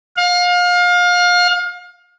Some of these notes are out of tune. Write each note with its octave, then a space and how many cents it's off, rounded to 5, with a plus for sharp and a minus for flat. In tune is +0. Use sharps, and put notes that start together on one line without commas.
F5 +30